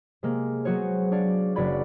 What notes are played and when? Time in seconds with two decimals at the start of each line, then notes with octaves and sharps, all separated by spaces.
0.23 C3 G#3 A#3
0.65 F#3 B3 F#4 G#4 C5 C#5
1.11 D4 C#5 D5 F5
1.55 F#1 F#3 F#4 D5 B5 G#6